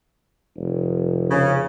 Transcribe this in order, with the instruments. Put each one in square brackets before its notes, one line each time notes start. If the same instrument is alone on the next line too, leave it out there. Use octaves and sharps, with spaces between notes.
[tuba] F1
[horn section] C#3